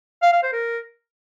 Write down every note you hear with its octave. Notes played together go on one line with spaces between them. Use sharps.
F5
F5
C5
A#4